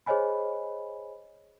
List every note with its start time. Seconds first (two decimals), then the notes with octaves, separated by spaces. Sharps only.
0.06 G#4 C5 C#5 D#5 G#5 B5